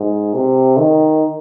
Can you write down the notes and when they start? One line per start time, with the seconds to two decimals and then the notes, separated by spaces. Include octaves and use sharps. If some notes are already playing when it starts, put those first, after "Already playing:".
Already playing: G#2
0.34 C3
0.78 D#3